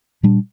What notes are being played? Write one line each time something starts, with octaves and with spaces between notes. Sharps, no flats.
A#2 G3 D4